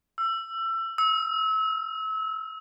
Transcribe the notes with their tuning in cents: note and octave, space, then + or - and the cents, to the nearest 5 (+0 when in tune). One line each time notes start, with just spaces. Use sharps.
E6 +25
E6 -30